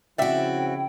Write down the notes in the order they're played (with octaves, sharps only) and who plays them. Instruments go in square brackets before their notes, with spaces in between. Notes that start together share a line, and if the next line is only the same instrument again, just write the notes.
[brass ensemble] C#3 F3 E4 [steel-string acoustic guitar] C4 F#4 [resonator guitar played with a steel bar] D5 E5 [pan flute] G5